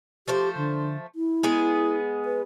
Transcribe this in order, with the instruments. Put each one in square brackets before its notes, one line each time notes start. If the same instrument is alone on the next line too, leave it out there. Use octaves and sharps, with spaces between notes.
[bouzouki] F3 A3 C5 [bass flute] G4
[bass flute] D3
E4
[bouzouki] G#3 B3 G#4
[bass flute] B4